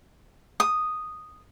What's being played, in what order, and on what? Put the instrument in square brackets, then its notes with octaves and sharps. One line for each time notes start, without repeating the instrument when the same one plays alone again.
[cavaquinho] D#6